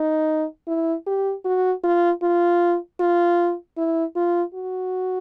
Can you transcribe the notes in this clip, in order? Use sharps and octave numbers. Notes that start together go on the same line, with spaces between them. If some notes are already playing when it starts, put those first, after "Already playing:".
Already playing: D#4
E4
G4
F#4
F4
F4
F4
E4
F4
F#4